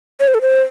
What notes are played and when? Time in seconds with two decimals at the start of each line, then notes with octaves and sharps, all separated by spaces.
0.20 C#5
0.28 C5
0.34 A4
0.41 C5